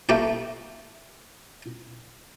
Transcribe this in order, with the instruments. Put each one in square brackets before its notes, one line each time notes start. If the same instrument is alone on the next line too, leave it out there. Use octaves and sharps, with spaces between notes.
[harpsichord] A3 A#3 G4 G5